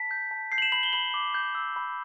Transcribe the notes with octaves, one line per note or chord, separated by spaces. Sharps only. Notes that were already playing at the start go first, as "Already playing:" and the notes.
Already playing: A5 B6
G6
A5
G6 C7
F#7
E7
B5 F#7
G7
B5 F#7
D6
G6
E6
B5